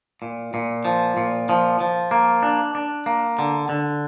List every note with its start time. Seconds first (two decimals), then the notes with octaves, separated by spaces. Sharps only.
0.22 A#2
0.54 A#2
0.85 F3
1.17 A#2
1.49 F3
1.80 F3
2.11 A#3
2.43 D4
2.75 D4
3.06 A#3
3.39 D3
3.69 D3